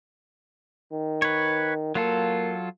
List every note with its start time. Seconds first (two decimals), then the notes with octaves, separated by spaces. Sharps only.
0.92 D#3
1.22 B4 C#5
1.95 F#3 A#3 F4 A4